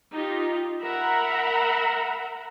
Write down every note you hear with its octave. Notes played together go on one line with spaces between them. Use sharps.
D#4 F4 G4
A#4 E5 F#5 A#5 B5